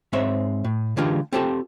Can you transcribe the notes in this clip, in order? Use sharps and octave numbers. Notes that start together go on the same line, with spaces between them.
G#2 G#3 C4 C#5 E5
A2
D3 E3 G#3 D4 F4 G4
C4 F4 G4 A4 A5